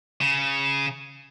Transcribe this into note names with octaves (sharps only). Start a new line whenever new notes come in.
C#3